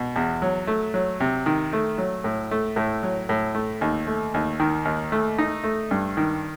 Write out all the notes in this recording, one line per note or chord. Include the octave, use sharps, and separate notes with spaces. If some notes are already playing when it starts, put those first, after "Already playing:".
Already playing: B2
E2
F#3
A3
F#3
C3
D#3
A3
F#3
A2
A3
A2
F#3
A2
A3
D#2
A3
D#2
D#3
D#2
A3
D#4
A3
G2
D#3